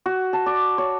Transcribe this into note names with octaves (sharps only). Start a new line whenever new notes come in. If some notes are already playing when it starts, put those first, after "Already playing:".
F#4
A5
D5
C#5